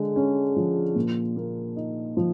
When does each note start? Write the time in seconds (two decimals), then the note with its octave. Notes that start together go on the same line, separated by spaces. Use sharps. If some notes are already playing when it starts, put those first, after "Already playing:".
Already playing: D3 G#3
0.16 C#4
0.56 F3
0.95 A#2
1.36 A#3
1.76 D#4
2.17 F3